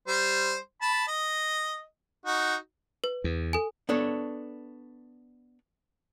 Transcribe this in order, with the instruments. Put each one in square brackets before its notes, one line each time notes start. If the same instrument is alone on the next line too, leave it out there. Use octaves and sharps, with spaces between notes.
[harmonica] G3 C5
A5 B5
D#5
D#4 F#4
[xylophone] B4
[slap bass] E2
[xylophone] A4 G#5
[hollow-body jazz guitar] B3 D4 A4 C#5